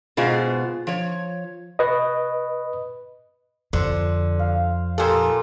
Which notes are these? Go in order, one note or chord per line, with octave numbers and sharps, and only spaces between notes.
G#2 B2 B3 F4 G#4 C5
F3 C#5
B4 D#5
F2 D3 C5
F5
A#2 F4 G4 A4 G5 G#5 D#6 E6